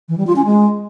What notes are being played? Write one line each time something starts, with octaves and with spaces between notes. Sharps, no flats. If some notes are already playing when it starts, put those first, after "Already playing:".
E3
G3
F4
C#4
G#3